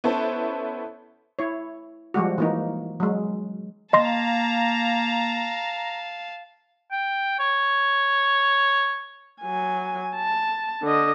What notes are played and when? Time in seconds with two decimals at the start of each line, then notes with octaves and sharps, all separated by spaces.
0.04 B3 C#4 E4 A4 C5 A5
1.39 E4 C#5
2.14 F3 G3 G#3 F#4
2.38 E3 A#3 D#4
3.00 F#3 G#3
3.93 A#3 D#5 F5 A5 A#5 C6 A#6
6.91 G5
7.39 C#5
9.41 F#3 G#5
10.16 A5
10.83 D3 D#5